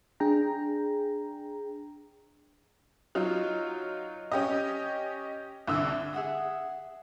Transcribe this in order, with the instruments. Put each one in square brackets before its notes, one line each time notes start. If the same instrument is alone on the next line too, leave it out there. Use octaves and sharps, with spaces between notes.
[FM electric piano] D4 G#4 G5 A#5
[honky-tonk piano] F#3 D#4 F4
C#4 G4 D#5
C2 D3 E6
[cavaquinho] G#4 E5 F#5 D#6